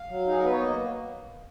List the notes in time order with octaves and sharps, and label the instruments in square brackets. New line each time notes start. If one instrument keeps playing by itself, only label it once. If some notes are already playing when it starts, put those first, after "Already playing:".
Already playing: [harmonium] F5
F#3
D#4 G#4
A#4
B3 B4
C#5
A#3 D#5